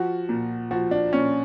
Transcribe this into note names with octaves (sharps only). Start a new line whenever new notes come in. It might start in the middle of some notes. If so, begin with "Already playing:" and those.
Already playing: F3 F#4
A#2
F3 F#4
D4
A#2 C#4